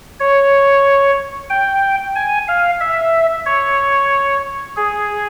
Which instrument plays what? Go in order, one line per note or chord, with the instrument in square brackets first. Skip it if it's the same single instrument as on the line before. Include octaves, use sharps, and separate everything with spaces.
[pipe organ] C#5
G5
G#5
F5
E5
C#5
G#4